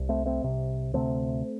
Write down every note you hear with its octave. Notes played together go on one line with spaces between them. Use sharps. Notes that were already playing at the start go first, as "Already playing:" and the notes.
Already playing: C2
A3 C4
A3 C4
C2 C3
D2 C3 A3 C4